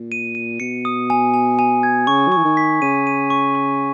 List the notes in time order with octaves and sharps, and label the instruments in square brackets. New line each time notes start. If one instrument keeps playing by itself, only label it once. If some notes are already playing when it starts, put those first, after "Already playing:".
Already playing: [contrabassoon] A#2
[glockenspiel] D#7
D#7
[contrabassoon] B2 [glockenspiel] C#7
[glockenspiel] D#6
G#5
G#5
G#5
G#6
[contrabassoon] C#3 [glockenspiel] C#6
[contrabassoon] F#3
[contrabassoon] E3 [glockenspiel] C#6
[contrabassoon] D#3
[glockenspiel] B6
[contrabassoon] C#3 [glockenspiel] D#7
[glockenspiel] D#7
C#6
C#6